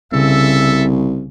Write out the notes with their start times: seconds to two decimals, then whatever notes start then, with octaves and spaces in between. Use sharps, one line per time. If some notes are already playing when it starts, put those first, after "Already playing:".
0.12 C2 C#3 A4 E5